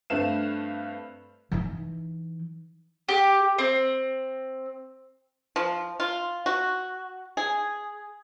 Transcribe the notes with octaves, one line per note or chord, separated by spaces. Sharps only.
G2 A3 C4 B4 F5 E7
E3 D#4
G4
C4
F3
F4
F#4
G#4